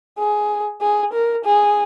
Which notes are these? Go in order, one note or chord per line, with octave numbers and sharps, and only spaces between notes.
G#4
G#4
A#4
G#4